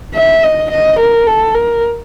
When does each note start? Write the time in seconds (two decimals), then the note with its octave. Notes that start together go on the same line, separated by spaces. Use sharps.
0.15 E5
0.43 D#5
0.71 D#5
0.99 A#4
1.27 A4
1.55 A#4